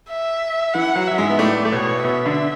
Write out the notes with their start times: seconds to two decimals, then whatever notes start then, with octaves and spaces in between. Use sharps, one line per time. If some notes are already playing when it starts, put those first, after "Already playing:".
0.09 E5
0.74 E3 F#5
0.96 F#3
1.07 F#3 E5
1.18 G#2 G#3
1.30 B3
1.39 A2 A3 D5
1.65 A3
1.72 B2 B3 C#5
2.04 B2 B3 E5
2.25 D3 D4